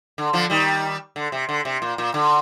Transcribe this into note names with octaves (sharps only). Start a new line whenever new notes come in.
D3
D3 F3
D#3 G3
D3
C3
D3
C3
A#2
A#2
D3